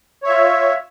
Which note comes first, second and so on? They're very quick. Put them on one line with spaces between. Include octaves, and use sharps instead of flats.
C#5 E5 F4